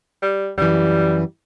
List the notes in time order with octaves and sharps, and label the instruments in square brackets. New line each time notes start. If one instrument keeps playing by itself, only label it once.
[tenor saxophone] G3
[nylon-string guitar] F#2 E3 [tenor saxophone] G3